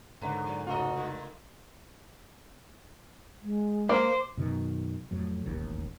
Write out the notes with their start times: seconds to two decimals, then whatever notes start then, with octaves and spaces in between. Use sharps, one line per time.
0.22 G#2 D3 C#4 A#4 B4
0.46 F3
0.67 F1 C#2 C#4 F#4 A4 D#5 A#5
0.96 A#2 D3 F4
3.43 G#3
3.89 A#3 C5 D6
4.37 F#2 B2 D#3
5.11 F2 A2 F#3
5.44 E1 A1 D#2